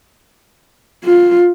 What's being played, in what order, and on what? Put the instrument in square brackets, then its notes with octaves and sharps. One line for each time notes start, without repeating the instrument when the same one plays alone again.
[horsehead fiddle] F4